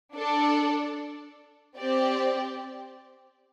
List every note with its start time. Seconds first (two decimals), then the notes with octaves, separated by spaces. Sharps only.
0.14 D4 A4 D5
1.78 C4 G4 D5